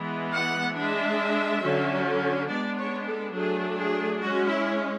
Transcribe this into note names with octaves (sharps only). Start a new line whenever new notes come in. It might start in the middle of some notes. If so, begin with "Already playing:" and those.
Already playing: E3 G#3 B3
F#5
G#3 D4 E5
D3 F#3 C#4
G#3 B3 D4 D5
C#5
A4
F#3 A3 D4 G#4
G#4
G#3 C#4 F#4
E4